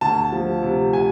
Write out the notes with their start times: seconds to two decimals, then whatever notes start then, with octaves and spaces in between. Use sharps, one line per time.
0.01 D2 A5
0.32 F3
0.63 C3
0.93 G#5